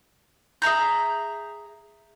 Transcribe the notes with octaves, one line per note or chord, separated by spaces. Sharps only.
G#4 E5 A#5 G6